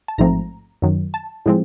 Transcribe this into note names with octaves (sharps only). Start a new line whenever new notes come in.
A5
A1 G#2 F3 A3 C4 A#5
F#2 D#3 F#3
A5
A2 F3 G#3 C4